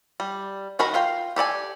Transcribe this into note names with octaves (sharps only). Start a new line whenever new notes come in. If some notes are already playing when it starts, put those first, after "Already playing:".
G3
D#3 F#4 A#4 D#5 B5
F4 F5 G5
G4 A4 D5 G#5